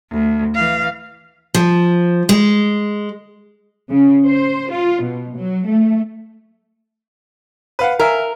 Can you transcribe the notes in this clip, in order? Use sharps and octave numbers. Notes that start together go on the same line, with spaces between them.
D2
E3 F5
F3
G#3
C#3
C5
F4
B2
F#3
A3
B4 F5 F#5
A#4 E5 F5 G#5